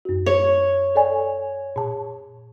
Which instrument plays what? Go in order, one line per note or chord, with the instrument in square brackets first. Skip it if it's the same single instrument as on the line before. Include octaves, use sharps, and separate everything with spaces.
[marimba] F#2 F#4
[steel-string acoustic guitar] C#5
[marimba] A4 D5 G#5
A#2 A5